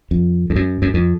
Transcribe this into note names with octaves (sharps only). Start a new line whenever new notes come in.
F2
F2
F#2
F#2
F2